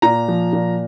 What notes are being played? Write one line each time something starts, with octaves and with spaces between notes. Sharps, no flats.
A#2 A#5
F3
A#2